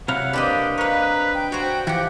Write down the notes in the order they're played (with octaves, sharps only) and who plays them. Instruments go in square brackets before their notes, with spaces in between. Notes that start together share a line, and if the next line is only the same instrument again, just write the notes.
[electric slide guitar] C3 F#3 F5 [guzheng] E4 [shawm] F#5
[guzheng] A#3 C4 B4 [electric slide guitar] D4 D#5 [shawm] G4
[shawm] B4 [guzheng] C#5 F5 [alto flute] A#5
[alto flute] G5
[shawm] F#4 [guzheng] C5 C#5
[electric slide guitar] E3 [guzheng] F3 G4 [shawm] F#5